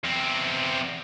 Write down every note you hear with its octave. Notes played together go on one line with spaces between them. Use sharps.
E2 C4